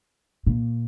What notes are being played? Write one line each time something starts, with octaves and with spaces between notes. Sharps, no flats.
A#2